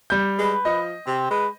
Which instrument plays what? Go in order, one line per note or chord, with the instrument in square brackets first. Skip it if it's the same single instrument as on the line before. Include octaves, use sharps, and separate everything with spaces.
[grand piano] G3 G6
[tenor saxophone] G#3 [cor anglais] B4
[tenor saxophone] F3 [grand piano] D#5
[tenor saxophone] C3 [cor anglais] C4
[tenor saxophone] G#3 [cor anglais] B4